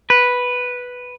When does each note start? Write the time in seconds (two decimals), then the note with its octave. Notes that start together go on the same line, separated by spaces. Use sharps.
0.10 B4